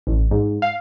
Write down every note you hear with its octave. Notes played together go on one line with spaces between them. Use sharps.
A1
G#2
F5